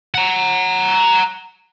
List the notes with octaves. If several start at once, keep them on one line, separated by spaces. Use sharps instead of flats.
F#5 A#5